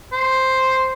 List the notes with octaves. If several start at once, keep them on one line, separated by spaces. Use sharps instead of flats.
C5